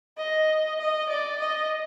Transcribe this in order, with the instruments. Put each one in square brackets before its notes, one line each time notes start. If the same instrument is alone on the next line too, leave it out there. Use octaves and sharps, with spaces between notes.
[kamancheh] D#5
D#5
D5
D#5